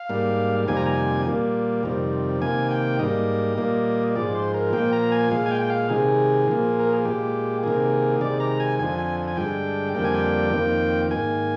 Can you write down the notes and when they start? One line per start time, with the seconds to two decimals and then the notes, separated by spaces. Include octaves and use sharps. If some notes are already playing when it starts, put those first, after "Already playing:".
Already playing: F5
0.09 G#2 G3 A#3
0.68 F2 C3 D#3 G3 A#3 G#5
0.77 A#5
0.86 G#5
1.26 A#2 G3 A#3
1.83 F2 C3 D#3 G3
2.42 C3 D#3 A#3 G#5
2.71 G5
2.99 G#2 G3 A#3 D#5
3.58 A#2 G3 A#3
4.15 G#2 F3 G#3 D5
4.35 C5
4.54 A#4
4.73 A#2 F3 A#3 G5
4.93 A#5
5.12 G#5
5.31 A#2 G#3 F5
5.46 G#5
5.51 G5
5.61 G5
5.70 F5
5.89 C3 D#3 G#3 G#4
6.48 A#2 F3 A#3
6.80 A#4
6.93 G#4
7.05 A#2 G#3 G4
7.63 C3 D#3 A#3 G#4
8.21 C3 D#3 G#3 D5
8.40 A#5
8.60 G#5
8.79 F2 D3 F3 G#5
8.98 G#5
9.28 G#5
9.37 G2 D3 G#3 G5
9.95 F2 D3 G3 A#3 G5
10.05 G#5
10.14 G5
10.53 F2 D#3 A#3
11.11 G#2 D#3 A#3 G#5